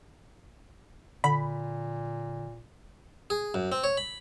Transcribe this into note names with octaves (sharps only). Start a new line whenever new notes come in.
A#2 D3 B5
G#4
F#2
C4
C#5
B5